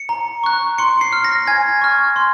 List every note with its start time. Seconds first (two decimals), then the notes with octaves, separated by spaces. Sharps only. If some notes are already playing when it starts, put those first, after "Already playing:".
Already playing: C#7
0.09 A#5
0.44 C#6 F#6
0.78 C6 C#7
1.01 C7
1.13 F6
1.24 A#6
1.47 G#5 G#6
1.81 C#6 F6
2.16 C6